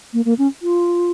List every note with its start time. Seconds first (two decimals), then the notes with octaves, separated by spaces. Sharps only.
0.13 A#3
0.25 A#3
0.38 C#4
0.62 F4